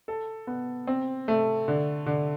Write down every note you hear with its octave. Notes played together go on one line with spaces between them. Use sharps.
A4
B3
C4
A3
D3
D3